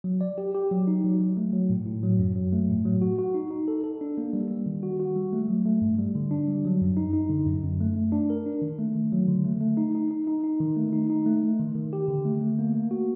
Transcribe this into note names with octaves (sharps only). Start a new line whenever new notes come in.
F#3
D5
G4
G4
F#3
D#4
F#3
F#3
A3
F#3
A2
A2
F#3
F#2
F#3
A3
A2
F#3
F#4
F#4
D#4
D#4
A4
A4
D4
A#3
G3
G3
D#3
F#4
F#4
G3
A3
F#3
A3
G2
G3
D3
D4
G3
F#3
F#2
D#4
D#4
D3
F#2
F#2
A3
A3
D4
A#4
D4
D#3
A3
D#3
F#3
D3
A3
A3
D#4
D#4
D#4
D#4
D#4
D#3
A3
D#4
D#4
A3
A3
D#3
D#3
G4
D3
A3
A3
A#3
A#3
F#4